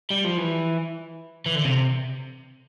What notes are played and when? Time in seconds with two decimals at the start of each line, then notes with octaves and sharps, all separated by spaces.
0.10 G3
0.24 F3
0.37 E3
1.46 E3
1.55 D3
1.65 C3